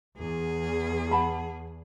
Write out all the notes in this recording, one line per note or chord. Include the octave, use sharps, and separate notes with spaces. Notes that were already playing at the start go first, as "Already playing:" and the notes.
E2 G#4
F#5 A5 B5